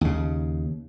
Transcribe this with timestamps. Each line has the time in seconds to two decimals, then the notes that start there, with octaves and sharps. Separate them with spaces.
0.01 D#2 C#3